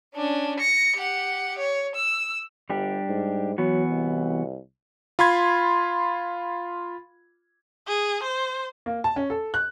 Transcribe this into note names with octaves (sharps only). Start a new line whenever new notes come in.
C#4 D4
A#6 C#7
G4 F#5
C#5
E6
G1 G3 D4 G4
G#2
E3 F#3 B3 F#4
C2
F4 B5 C6 G#6
G#4
C5
A#3
A5
C#4
A4
F#6